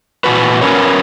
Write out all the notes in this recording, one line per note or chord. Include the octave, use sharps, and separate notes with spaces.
A#2 E3 F#4 B4
C#4 A#4 B4 C#5